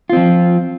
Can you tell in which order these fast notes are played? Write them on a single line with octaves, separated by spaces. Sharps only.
F4 C4 F3